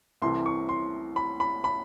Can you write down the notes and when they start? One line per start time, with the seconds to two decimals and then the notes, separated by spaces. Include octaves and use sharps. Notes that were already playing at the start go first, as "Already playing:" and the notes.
0.22 C2 C3 E3 A3 C6
0.46 C#6
0.69 C6
1.16 B5
1.40 B5
1.64 B5